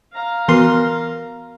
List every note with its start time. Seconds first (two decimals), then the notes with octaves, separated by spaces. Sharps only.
0.13 F5 A#5
0.48 E3 B3 F#4 A#4 C6 C7